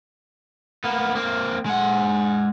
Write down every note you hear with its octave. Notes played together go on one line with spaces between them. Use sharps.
A#3 B3
A#3 C4
G#3 F#5